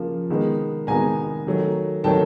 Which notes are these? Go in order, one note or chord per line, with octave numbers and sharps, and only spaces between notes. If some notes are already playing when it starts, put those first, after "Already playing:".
Already playing: C#3 F3 A#3
C3 D#3 G#3 B3
C3 D#3 G#3 B3 G#5 A#5
D#3 F#3 A3
D#3 F#3 A3 G5 A5